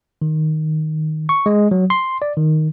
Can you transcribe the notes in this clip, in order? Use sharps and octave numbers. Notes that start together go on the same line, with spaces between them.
D#3
C#6
G#3
F#3
C6
D5
D#3